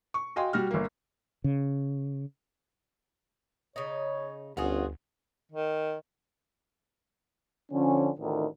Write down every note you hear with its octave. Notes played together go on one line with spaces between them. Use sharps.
C#6
F#4 D#5 F5 G5 G#5 C6
G3 F#4 F6
G1 A#3
C#3
C#3 D#4 C#5
G1 D2 C#4 F4 F#4 G#4
D#3
D3 F3 C#4
A1 D2 A2 D#3